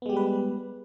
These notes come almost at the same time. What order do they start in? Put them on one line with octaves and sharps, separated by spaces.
B3 G#3 G4 G3 B4